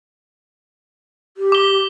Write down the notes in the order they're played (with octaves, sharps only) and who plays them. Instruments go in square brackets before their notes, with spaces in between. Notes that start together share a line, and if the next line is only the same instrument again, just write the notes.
[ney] G4
[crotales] D6 G7